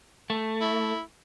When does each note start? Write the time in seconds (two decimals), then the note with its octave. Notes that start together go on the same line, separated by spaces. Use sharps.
0.30 A3
0.61 E4